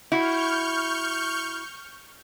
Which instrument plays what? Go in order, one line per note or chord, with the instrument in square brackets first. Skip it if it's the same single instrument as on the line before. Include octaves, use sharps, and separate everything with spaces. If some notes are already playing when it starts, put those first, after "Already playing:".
[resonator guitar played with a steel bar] E4 F#4 [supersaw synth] C#6 F6 G6